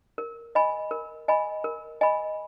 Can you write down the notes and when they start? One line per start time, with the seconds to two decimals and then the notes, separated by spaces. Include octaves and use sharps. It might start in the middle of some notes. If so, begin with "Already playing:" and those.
0.18 A#4
0.55 D#5 G#5 B5
0.91 A#4
1.28 D#5 G#5 B5
1.64 A#4
2.01 D#5 G#5 B5